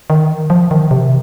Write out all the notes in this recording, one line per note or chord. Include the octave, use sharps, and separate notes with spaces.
D#3
F3
D#3
C3